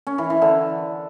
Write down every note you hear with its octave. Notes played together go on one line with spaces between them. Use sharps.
C#4
E3
E3
D3